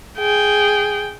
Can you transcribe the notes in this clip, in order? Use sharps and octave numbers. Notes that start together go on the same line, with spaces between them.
G#4 G5